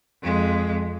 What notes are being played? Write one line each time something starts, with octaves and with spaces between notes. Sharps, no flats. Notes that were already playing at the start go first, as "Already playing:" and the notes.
F2 G#3